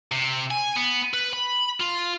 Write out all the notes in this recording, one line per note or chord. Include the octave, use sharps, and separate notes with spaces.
C3
G#5
B3
B4
B5
F4